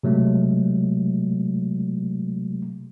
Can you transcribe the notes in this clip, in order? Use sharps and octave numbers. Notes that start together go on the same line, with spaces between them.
C3 F#3 G#3 A3